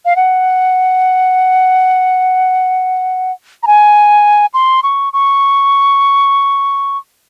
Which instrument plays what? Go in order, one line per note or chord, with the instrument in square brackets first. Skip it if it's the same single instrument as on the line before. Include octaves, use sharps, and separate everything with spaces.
[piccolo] F5
F#5
A#5
G#5
C6
C#6
C#6